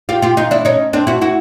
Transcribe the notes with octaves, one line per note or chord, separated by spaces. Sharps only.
F4 G4
F4 G4
D#4 F4
D4 E4
C#4 D#4
C4 D4
E4 F#4
E4 F#4